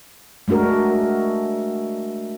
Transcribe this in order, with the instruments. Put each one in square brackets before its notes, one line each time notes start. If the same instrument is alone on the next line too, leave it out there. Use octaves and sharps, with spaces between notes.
[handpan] G#3 A3 D4 F#4 A#4